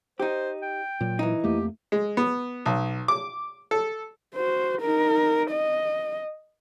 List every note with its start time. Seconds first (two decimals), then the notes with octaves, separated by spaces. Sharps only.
0.20 D#4 G4 C5
0.62 G5
1.01 A#2 F#3
1.19 E3 D#4
1.44 F2 A3 A#3 G4
1.92 G#3
2.17 B3
2.66 B1
3.08 D6
3.71 A4
4.35 F#4 C5
4.81 D#4 A#4
5.51 D#5